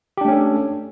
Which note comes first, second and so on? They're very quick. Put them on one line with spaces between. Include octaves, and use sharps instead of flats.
G4 D4 A3 C#4 A4